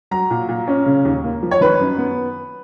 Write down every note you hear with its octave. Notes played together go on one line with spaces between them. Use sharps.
F#3 A#5
A#2
A#2
C#4
C#3
D#2
A#3
F3
C#5
D#3 B4
F#2
B3